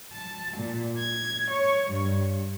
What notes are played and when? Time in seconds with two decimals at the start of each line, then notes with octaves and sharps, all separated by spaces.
0.13 A5
0.57 A#2
0.98 G#6
1.51 C#5
1.92 G2